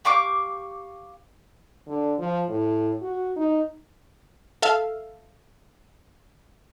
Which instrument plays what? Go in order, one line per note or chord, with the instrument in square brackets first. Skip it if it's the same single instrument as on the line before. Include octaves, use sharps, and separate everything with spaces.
[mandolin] G4 F5 C#6 D6
[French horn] D3
F3
A2
F#4
D#4
[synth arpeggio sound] A4 E5 F5